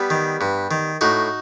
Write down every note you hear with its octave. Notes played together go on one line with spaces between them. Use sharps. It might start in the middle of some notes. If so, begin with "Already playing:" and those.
Already playing: G3 B3
D#3
G2
D#3
A2 D#4 F#4